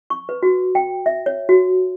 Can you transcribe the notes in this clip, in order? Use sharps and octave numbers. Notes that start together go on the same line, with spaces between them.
C#6
B4
F#4
G5
E5
C#5
F#4